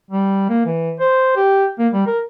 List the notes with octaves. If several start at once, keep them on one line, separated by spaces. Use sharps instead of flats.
G3
A#3
E3
C5
G4
A#3
G3
A#4